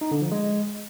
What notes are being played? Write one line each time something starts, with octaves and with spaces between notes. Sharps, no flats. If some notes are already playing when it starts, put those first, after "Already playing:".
D#4
D3
F3
G#3